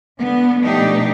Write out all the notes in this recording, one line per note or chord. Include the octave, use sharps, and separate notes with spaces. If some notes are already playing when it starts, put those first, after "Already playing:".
D3 B3
B2 F3 A3 D4 D#4 G4